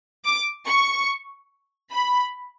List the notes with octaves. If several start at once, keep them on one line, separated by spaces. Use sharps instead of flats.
D6
C#6
B5